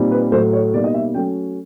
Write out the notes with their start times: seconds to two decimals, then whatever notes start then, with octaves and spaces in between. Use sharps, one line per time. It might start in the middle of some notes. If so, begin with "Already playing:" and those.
Already playing: A#2 G3 C4 D#4
0.11 B4
0.32 A2 F#3 A3 C5
0.53 C#5
0.73 B2 G3 A#3 D#4 D5
0.84 D#5
0.94 E5
1.14 F#3 A3 C#4 G5